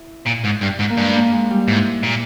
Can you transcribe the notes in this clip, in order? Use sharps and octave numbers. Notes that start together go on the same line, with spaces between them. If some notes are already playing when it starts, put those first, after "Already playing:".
Already playing: E4
A#2
G#2
G2
G#2
A#3
G2 G#3
A#3
G#3
G3
G#2 E4
A#2